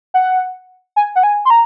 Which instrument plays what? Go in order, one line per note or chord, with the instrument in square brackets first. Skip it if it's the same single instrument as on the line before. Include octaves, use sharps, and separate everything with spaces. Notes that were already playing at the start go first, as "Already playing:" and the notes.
[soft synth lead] F#5
G#5
F#5
G#5
C6
A#5